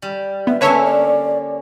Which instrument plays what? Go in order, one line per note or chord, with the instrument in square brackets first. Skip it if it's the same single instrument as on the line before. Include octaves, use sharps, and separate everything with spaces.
[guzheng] G3
[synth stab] B3 [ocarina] E5
[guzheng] D3 A#3 C#4 [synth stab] B4 C#5 E5 [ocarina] A5
[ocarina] D5